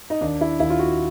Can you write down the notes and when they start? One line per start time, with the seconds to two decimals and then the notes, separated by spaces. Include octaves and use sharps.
0.10 D#4
0.21 D#2 D4
0.41 E4
0.60 D#2 E4
0.70 F4
0.79 F#4